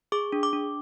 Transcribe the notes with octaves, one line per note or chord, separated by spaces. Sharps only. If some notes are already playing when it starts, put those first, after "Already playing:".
G#4 D6
D4
D6
D4